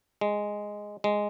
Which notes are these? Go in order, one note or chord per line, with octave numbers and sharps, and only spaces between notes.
G#3
G#3